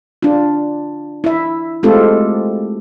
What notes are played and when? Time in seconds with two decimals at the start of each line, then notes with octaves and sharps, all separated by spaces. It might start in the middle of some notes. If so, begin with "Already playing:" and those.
0.23 D4 F4
1.24 E4 E5
1.83 G#3 A3 C4 F4 G4 A4